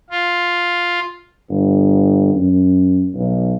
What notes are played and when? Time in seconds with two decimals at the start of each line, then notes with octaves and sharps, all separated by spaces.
0.10 F4
1.49 G1
2.35 F#2
3.14 B1